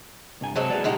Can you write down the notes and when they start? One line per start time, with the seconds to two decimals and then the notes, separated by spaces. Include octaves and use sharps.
0.41 C2 G2 G#5
0.55 C3 F#3 G#3 A4 C5
0.70 G#4 B4 D5
0.84 C#2 A#2 G#3 D#4 F#4 G4